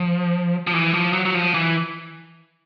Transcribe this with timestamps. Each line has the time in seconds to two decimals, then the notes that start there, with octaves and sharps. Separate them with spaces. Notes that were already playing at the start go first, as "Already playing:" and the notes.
Already playing: F3
0.67 F3
0.73 E3
0.94 F3
1.13 F#3
1.25 F#3
1.34 F3
1.54 E3